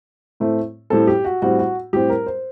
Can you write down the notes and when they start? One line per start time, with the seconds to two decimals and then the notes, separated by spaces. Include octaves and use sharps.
0.40 A2 A3 C4
0.90 A2 G3 C4 A4
1.07 G4
1.25 F#4
1.42 A2 G3 C4 F#4
1.59 F#4
1.93 A2 G3 C4 G4
2.09 A#4
2.26 C5